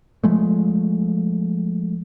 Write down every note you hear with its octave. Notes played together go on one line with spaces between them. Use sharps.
F3 G#3 A3